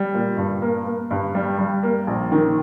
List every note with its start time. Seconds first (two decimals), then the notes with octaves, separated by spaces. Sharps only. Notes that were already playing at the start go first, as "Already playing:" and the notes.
Already playing: G3
0.14 A#2
0.37 G2
0.62 A#3
0.86 A#3
1.10 G2
1.35 G3
1.59 G3
1.83 A#3
2.07 A#1
2.32 D#3